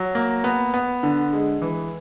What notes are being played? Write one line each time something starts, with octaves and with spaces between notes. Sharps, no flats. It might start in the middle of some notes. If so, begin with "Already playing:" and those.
Already playing: F#3
A#3
B3
B3
D3
G#3
E3